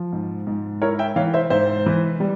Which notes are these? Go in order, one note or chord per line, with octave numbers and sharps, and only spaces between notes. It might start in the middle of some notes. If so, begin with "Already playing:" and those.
Already playing: F3
G#2
G#2
E4 A#4 C#5
E5 G5
E3 C#5 F5
C5 E5
G#2 C5 E5
E3
G3